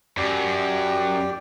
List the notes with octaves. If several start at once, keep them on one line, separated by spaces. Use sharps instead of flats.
F#2 G4 D5 G5